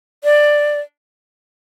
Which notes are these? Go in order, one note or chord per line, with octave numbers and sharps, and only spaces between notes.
D5